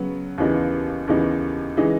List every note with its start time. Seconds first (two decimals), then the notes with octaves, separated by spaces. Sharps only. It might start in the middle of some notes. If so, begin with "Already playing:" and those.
Already playing: C#3 F#3 B3
0.38 D#2 C#3 E3 B3 D#4
1.08 D#2 C#3 E3 B3 D#4
1.77 C#3 E3 G#3 D#4